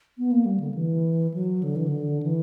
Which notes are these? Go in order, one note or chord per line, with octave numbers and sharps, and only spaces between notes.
B3
A#3
G3
D3
E3
F#3
D3
E3
D3
E3